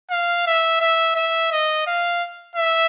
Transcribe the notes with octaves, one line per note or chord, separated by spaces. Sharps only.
F5
E5
E5
E5
D#5
F5
E5